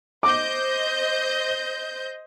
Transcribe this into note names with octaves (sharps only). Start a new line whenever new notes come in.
C5 D#5 D6 G6